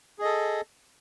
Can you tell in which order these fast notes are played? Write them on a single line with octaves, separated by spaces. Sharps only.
G#4 D#5 A4